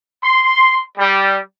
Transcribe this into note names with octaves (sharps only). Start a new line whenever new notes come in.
C6
G3